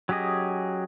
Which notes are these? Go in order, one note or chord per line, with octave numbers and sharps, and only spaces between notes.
F#3 C#4 G4 G#4 D#5